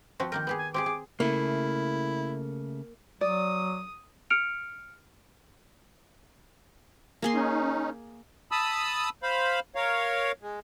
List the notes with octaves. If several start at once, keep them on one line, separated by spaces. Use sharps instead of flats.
F3 C4 F#4
D#3 A#3 A#4 G5
B3 G4 G#4
G#5
C4 G4 G#4 D6
G#4
C#3 A3 A#3 E4
F#3 D5 D#6
F6 C#7 D7 F7
A#3 G#4 C6
C#4 D#4
A5 B5 D#6 E6
C5 F5 B5
A#4 C#5 F5
G#3